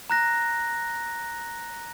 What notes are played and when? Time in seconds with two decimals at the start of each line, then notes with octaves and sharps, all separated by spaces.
0.10 A#5 F#6 A#6